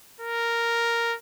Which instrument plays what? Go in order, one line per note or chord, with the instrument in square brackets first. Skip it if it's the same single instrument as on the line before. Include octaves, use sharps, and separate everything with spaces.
[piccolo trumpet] A#4